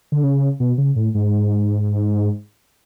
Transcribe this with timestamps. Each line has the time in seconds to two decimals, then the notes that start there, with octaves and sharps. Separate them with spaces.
0.12 D3
0.24 C#3
0.60 B2
0.78 C#3
0.96 A2
1.15 G#2